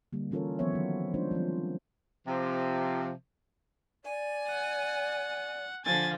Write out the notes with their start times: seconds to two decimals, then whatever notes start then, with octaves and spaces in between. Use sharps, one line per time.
0.13 D3 G3 A#3
0.31 E3 C#4 F4 A4 A#4 C#5
0.59 D#3 F3 B3 C5 C#5 E5
0.73 D#3 F#3
1.14 G#3 C#4 D4 F4 C5
1.31 F3 G3 C4
2.27 C3 F3
4.04 D5 G#5
4.48 F#5
5.85 D3 F3 G#5 A6